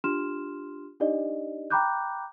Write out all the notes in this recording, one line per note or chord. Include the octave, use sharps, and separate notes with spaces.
D4 F4 G4 C6 F6 E7
D4 D#4 G4 D5 D#5
G5 A#5 B5 D6 F#6 G6